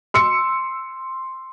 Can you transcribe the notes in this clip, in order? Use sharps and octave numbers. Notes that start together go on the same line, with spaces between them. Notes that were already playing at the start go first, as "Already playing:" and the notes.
C6 E6 C#7